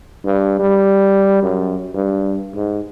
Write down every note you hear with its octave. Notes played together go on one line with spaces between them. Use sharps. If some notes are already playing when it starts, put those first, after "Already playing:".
G2
G3
F#2
G2
G#2